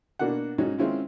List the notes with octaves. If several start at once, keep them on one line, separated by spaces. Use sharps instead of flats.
B2 A#3 D4 F#4 F#5
G#2 C#4 D#4 F#4
D#3 G#3 C4 C#4 E4 F4